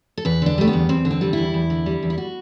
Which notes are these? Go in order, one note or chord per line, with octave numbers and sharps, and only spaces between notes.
A4
E2 B4
D3 D4
G3 A3
B3
E2
E2 C4
D3
C4
G3
E2 E4
E2
D3
G3
E2
E4
F#4